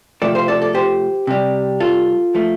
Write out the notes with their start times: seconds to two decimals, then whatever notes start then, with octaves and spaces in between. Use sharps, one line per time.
0.22 C3 F3 A3 A4 D5
0.35 C5 F5
0.48 A4 D5
0.62 A4 D5
0.75 G4 C5
1.27 C3 G3
1.80 F4 A4
2.35 F3 A3